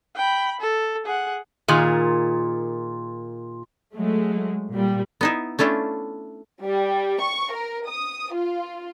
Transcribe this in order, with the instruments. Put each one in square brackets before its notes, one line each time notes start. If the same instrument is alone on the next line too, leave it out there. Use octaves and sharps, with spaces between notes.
[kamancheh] G5 B5
A4
G#4 F#5
[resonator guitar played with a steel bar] A#2 D#3 F4 G#4
[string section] F#3 G#3 A3
A#2 G3
[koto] B3 D#4 E4
A3 C#4 D4 E4 F4
[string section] G3
C#6
A#4
D#6
F4